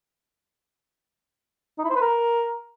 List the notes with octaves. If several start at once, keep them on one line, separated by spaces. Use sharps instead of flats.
D#4
E4
C5
B4
A#4